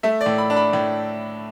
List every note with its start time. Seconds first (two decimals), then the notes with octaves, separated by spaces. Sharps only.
0.03 A3 E5
0.21 D5
0.26 A2
0.38 B5
0.50 D4
0.56 B5
0.73 A2